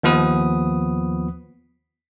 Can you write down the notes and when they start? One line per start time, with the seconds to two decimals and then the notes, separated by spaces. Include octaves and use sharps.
0.03 D#2 F3 B3 B4 D#6